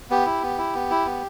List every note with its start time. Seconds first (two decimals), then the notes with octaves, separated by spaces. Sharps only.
0.10 B3 G4
0.26 E4
0.43 B3
0.58 E4
0.75 B3
0.91 E4
1.06 B3